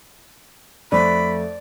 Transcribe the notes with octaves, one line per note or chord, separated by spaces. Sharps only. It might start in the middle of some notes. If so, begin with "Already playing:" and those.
F2 A3 D5 B5